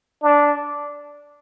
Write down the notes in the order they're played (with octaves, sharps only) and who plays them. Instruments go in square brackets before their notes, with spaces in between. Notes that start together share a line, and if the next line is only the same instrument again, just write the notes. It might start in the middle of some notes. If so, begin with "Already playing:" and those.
[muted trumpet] D4